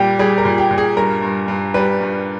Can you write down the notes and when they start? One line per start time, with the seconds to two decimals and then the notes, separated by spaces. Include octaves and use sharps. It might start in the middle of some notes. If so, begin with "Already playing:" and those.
Already playing: A#2 G3 G4
0.19 G3 G#4
0.38 A#4
0.45 A#2
0.58 G4
0.71 A#2
0.78 G#4
0.97 G2 A#4
1.22 G2
1.48 G2
1.74 G3 B4
2.01 G2